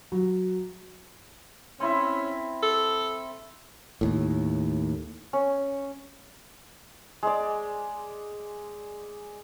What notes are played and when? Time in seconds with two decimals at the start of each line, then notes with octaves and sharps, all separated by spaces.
0.12 F#3
1.80 C4 C#4 E4 E5
2.63 A4
4.01 D#2 A2
5.33 C#4
7.23 G#3 D5